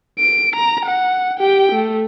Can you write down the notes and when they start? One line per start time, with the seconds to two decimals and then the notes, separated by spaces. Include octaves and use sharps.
0.19 D7
0.56 A#5
0.85 F#5
1.39 G4 G5
1.72 A3